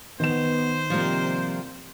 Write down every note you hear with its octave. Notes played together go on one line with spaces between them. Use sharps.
D#3 B3 C5 E7
C3 F3 G3 A#3